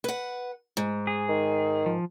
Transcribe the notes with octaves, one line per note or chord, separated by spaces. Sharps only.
B4 F#5
G#2
G#4
D#3
F3